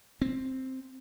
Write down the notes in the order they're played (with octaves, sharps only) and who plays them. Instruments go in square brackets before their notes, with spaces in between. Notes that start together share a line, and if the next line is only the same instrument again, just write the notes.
[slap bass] C4